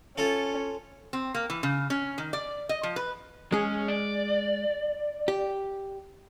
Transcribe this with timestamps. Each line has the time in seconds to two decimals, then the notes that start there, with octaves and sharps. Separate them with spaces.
0.18 C#4 F4 A4
1.13 C4
1.35 A#3
1.50 E3
1.63 C#3
1.90 C#4
2.18 D#3
2.33 D5
2.69 D#5
2.83 F3
2.96 B4
3.52 G#3 C#4 G#4
3.88 D5
5.28 G4